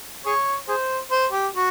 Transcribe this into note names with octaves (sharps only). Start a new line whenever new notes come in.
G#4 C#5
G#4 C5
C5
G4
F#4